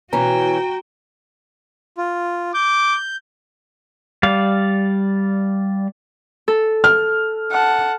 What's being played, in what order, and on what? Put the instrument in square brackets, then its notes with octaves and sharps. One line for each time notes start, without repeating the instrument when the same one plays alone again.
[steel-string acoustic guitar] B2 E3 C#4 [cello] F#4 G5 [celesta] A#5
[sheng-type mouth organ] F4
[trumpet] D6 [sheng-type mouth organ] G6
[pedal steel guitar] G3 D5 F5
[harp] A4
[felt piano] F6
[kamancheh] F#5 A5